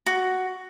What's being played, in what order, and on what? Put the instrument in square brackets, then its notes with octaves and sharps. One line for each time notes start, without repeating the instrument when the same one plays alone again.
[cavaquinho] F#4